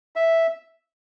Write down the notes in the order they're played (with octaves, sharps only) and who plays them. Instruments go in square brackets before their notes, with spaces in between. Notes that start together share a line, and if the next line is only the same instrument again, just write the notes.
[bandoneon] E5